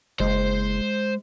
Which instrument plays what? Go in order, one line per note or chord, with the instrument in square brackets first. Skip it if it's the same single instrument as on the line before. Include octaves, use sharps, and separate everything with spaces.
[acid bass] F#1 [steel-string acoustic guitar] G#3 [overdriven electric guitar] C5